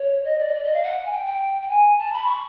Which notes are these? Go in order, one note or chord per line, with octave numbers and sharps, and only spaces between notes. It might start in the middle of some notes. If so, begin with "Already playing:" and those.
Already playing: C#5
D#5
D5
D#5
D5
D#5
F5
F#5
G#5
G5
G5
G5
G#5
A5
B5
C#6